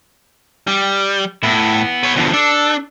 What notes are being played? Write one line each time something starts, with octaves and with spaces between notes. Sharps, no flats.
G3
A2 B3 E4
B4 C#5
E2 B2 D3 F3
D4 A4